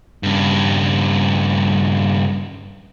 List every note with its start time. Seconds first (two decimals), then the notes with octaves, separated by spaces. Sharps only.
0.23 G2 C#3